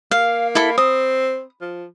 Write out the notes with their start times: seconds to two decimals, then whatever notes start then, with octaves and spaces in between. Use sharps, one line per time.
0.11 A#3 F5
0.55 E4 A4 B5
0.78 C4 D#6
1.61 F3